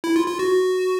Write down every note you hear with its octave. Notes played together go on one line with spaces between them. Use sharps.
E4
F4
F4
F#4